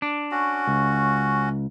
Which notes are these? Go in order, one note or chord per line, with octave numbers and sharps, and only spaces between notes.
D4
C#4 F#4
C#2